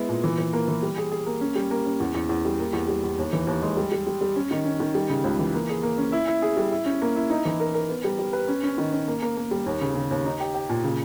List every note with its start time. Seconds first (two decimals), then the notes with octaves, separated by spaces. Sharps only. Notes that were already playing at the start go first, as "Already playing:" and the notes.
Already playing: G#3 B3 E4
0.09 A#2
0.24 E3
0.38 E3
0.53 A#3
0.68 E3
0.83 G3
0.98 G#4
1.12 G#4
1.26 A#3
1.41 C#4
1.56 G3
1.71 A#3
1.86 C#4
2.00 E2
2.15 E2
2.29 E2
2.45 G3
2.59 A#3
2.73 E2
2.88 G3
3.04 E2
3.18 D#2
3.33 E3
3.47 D#2
3.63 G#3
3.77 G3
3.92 G3
4.07 G3
4.21 G3
4.36 C#4
4.51 D#3
4.65 C#4
4.80 D#3
4.95 G3
5.10 C#3
5.24 C#2
5.39 E3
5.54 A#3
5.69 G#4
5.83 A#3
5.98 C#4
6.12 E4
6.28 E4
6.42 G#4
6.57 G3
6.71 E4
6.86 C#4
7.02 A#3
7.16 E4
7.30 D#4
7.45 E3
7.60 A#4
7.74 A#4
7.89 B3
8.04 G3
8.19 G3
8.33 B4
8.48 C#4
8.64 C#4
8.78 D#3
8.93 C#4
9.08 A#3
9.22 A#3
9.37 A#3
9.51 G3
9.66 D#2
9.81 C#3
9.95 C#3
10.11 D#2
10.25 D#4
10.40 G4
10.55 G4
10.69 A#2
10.84 C#3